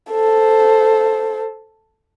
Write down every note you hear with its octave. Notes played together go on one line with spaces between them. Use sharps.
A4 C5